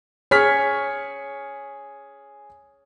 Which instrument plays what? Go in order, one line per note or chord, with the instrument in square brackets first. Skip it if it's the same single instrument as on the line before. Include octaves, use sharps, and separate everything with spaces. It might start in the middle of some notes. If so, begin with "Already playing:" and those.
[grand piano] G#4 F6 B6 [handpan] C#5